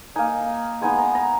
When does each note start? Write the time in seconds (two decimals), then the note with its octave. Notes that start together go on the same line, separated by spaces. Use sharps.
0.16 A#3 D#4 G#5
0.81 G#3 B3 D#4 G#5
0.98 A#5
1.15 A#5